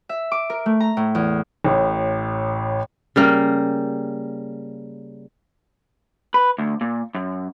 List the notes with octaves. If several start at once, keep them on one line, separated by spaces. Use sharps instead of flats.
E5
D6
A#4
A3
A#5
A2
E2
A1 A2
C#3 G3 A#3
B4
D2
A#2
F#2